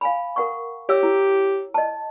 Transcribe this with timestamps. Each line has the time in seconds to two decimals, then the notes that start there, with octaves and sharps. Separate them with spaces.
0.01 F5 G#5 B5
0.36 A#4 F#5 C#6
0.89 G4 C#5 E5 E6
1.03 E4
1.74 D#5 A5